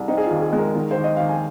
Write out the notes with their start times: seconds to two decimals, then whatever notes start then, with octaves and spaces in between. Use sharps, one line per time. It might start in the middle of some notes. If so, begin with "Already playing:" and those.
Already playing: C2
0.08 C4 D#4
0.18 G#4
0.25 F4
0.31 D#2
0.42 G#4
0.53 G#3
0.58 A#4
0.75 D#3
0.91 C5
0.97 D#2
1.04 D#5
1.16 D#2 F5
1.29 G#5